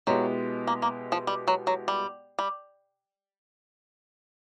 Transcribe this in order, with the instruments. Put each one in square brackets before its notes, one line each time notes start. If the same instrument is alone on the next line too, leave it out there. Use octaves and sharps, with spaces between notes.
[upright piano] B2 G#3 B3 E4 G4 [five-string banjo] F#3
[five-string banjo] A#3
A#3
F3
G3
F#3
F#3
G3
G3